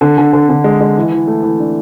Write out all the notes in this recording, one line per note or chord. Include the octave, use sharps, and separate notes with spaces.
D3
D3
D3
D3
G#3
G#3
E3
E3
A3
E3
D4